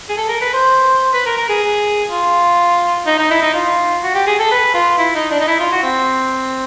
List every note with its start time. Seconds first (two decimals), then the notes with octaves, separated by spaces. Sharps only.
0.09 G#4
0.18 A4
0.28 A#4
0.41 B4
0.53 C5
1.13 B4
1.26 A#4
1.37 A#4
1.49 G#4
2.09 F4
3.06 D#4
3.19 D#4
3.31 E4
3.42 D#4
3.54 F4
4.03 F#4
4.14 G4
4.27 G#4
4.39 A4
4.51 B4
4.74 F4
4.98 E4
5.15 D#4
5.31 D4
5.40 D#4
5.47 E4
5.60 F4
5.72 F#4
5.83 C4